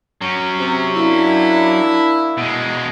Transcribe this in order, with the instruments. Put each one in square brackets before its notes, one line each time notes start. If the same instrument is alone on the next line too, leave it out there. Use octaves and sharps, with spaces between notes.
[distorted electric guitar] F#3 C#4
[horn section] C3
A#3 D4 E4
[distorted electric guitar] B2 G#3